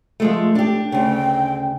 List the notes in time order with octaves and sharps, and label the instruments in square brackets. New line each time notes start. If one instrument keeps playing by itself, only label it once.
[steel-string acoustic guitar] F3 G#3 A3
D4 G4
[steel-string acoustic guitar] D2 C#3 [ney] G5